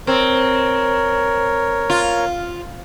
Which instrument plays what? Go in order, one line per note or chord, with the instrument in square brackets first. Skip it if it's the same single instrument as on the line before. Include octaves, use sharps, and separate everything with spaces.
[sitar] C4 [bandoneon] A#4 C#5
[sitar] F4